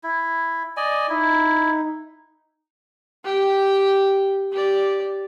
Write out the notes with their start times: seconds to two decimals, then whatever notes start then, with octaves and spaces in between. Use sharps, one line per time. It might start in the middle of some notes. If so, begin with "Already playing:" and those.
0.04 E4
0.77 D5 D#5 G#5
1.09 D#4 E4
3.24 G4 G5
4.52 G4 D5